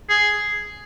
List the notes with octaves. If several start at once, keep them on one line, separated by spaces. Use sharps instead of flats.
G#4